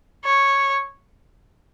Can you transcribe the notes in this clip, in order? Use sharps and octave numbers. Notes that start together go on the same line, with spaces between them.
C#5